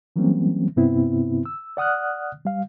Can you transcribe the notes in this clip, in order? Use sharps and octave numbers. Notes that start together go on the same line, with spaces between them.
E3 F#3 G3 A#3 C4 C#4
G2 C3 B3 C4 E4
E6
D5 F#5 D#6 F6 F#6
G3 F5